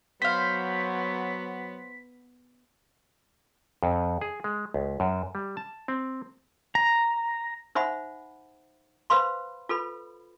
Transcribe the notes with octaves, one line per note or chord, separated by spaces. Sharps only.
F#3 B3 C5 F5 B6
F2
G#4
G#3
C#2
F#2
G3
A5
C4
A#5
D#4 C5 E5 F#5 B5
B4 C5 F5 B5 C6
F4 A4 B4 B5